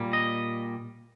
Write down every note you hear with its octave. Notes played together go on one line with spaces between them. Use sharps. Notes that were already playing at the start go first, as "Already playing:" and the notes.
Already playing: A#2 G3 A#3
D#5